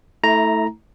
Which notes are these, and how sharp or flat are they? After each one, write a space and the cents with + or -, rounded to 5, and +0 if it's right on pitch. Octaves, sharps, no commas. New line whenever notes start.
A3 +0 E4 -25 A#5 +0